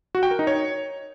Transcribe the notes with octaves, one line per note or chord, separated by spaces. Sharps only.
F#4
G5
A#4
D#4
C#5